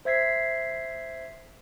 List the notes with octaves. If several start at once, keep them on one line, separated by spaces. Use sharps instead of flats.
C5 E5 G#6 B6 C7